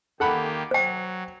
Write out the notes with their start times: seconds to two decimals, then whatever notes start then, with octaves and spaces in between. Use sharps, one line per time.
0.20 D#3 A#3 G4 A4 F#5 B5
0.71 F#3 C5 G5